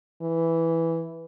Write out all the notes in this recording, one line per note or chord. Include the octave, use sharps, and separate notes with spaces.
E3